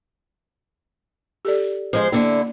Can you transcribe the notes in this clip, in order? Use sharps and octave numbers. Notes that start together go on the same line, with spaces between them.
G4 A4 D5
F3 G#3 C5
D3 A#3 E4 D5